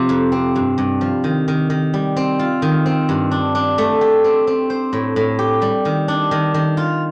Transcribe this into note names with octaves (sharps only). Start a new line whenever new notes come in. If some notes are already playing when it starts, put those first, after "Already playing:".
Already playing: C3 F3
F2
C4
G2
G2
F3
D#3
D#3
D#3
G3
C4
F4
D#3
C4
G2
D4
D4
A3
G4
C4
C4
C5
A2
A2
G4
G3
D#3
D4
D#3
D#3
F4